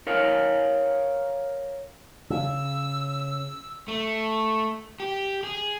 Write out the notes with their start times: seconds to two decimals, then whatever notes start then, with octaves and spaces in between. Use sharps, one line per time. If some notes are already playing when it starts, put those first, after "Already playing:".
0.07 A#4 C#5 F5
2.30 C#3 E6
3.88 A3
5.00 G4
5.43 G#4